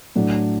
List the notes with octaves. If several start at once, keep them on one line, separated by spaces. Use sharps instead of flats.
A2 F#3 A3 D4